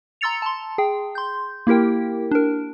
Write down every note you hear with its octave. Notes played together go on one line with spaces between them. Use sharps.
A#5 C6 E6 A6 C#7 F7
A5 C6
G#4 G5
C6 G6
A#3 E4 G4 A#4 G5
D4 A#4